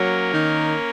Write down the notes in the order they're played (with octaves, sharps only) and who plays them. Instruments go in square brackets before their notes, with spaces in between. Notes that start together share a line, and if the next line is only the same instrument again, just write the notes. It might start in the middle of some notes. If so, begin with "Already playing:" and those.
Already playing: [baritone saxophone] F#3 [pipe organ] A#3 C#4 A#4
[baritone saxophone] D#3